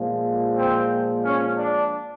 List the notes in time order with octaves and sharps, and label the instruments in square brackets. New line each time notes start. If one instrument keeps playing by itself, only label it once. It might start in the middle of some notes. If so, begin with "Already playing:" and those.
Already playing: [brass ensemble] A#2 F3 G#3
C4
C#4
D4